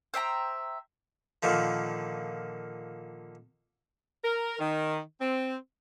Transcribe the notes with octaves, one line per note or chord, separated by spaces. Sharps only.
C5 E5 G5 A#5
A#2 D3 D#3 F3
A#4
D#3
C4